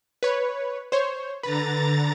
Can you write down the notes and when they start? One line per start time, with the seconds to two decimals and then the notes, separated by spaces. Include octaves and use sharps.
0.23 B4 C#5
0.92 C5 C#5
1.43 D3 B4 A#5 A6